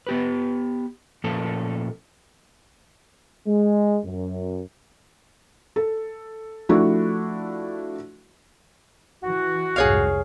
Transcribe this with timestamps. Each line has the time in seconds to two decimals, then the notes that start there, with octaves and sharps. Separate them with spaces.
0.07 B3 G4 B4
1.24 A#2 F3 A3 A#3 C#4 A4
3.47 G#3
4.05 F#2
5.76 A4
6.69 F3 A3 D4 E4 F#4
9.23 E3 F#4
9.76 C2 F2 G#2 G#4 C#5 F5